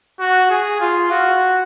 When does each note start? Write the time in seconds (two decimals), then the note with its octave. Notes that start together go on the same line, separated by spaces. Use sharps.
0.20 F#4
0.50 G#4
0.80 F4
1.11 F#4